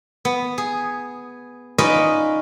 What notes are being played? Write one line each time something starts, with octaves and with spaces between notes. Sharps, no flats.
B3
G#4
C#4 D#4 F4 B4 D5 D#5